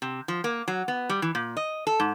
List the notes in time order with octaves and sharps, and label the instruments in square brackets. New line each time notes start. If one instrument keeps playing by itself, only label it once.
[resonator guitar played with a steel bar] C3
F3
A#3
F#3
B3
G3
E3
A#2
D#5
A4
G#2